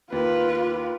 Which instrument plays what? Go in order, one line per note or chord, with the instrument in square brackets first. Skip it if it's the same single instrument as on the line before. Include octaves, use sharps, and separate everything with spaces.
[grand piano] D#2 [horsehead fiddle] F4 [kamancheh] B4